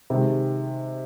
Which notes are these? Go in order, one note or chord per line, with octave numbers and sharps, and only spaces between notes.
C3 D#3 G#3